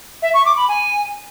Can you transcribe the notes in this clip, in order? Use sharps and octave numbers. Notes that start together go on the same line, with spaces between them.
E5
C#6
D6
B5
G#5